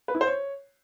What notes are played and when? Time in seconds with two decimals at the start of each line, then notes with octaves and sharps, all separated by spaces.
0.08 B4
0.15 E4
0.21 C5
0.27 C#5